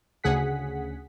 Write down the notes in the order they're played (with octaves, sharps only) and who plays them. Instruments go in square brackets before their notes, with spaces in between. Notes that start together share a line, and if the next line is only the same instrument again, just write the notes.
[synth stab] D2 C#3 G#4 F#5 B6